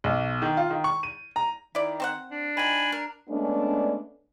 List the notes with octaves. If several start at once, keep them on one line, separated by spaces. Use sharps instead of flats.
B1
D#3
F4
D#3
C#6
D#7
A#5
D#3 E4 D5
C4 C5 F#5
D4
D#3 F3 G#5 B5
A#4
G#3 A3 B3 C#4 D4